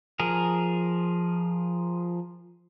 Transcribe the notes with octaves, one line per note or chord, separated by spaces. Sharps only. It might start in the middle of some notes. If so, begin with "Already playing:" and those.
F3 G#4 A#4